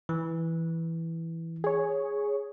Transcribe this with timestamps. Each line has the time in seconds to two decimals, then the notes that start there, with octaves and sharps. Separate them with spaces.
0.09 E3
1.64 G#4 C#5